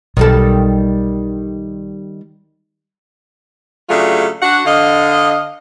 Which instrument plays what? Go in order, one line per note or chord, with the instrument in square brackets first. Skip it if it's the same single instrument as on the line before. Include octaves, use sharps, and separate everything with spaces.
[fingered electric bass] B1 [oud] D#3 G3 A4
[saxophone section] C#3 F#3 A3 D4 F4 G#4
D4 F#4 F#5
D3 D#5 F5